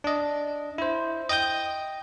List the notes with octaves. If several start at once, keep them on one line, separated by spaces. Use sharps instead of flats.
D4 D#5
E4 C5
D#5 G5 D#6 G6